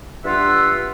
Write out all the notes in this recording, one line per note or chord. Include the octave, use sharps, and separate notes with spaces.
G2 F4 E5 F#5 E6